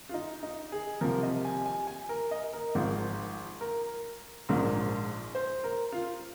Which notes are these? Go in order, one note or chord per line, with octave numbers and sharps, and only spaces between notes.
F4
D#4
D#4
G#4
C2 C3 F3 A#4
D#5
G#5
G#5
G#5
A#4
D#5
A#4
G#1 G#2 F3
A#4
A#1 G#2 F3 A#4
C5
A#4
F4